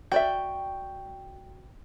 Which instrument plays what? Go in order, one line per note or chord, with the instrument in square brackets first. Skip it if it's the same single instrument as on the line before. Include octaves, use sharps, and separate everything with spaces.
[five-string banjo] F#4 D5 E5 [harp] G5